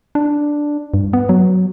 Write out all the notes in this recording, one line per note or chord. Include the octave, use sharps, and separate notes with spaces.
D4
G2
B3
F#3